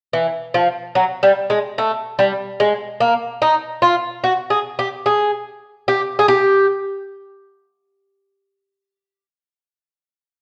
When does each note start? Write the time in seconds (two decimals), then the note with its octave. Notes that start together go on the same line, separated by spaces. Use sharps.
0.13 E3
0.54 F3
0.95 F#3
1.23 G3
1.50 G#3
1.78 A3
2.19 G3
2.60 G#3
3.00 A#3
3.42 D#4
3.82 F4
4.24 F#4
4.50 G#4
4.79 G4
5.06 G#4
5.88 G4
6.19 G#4
6.28 G4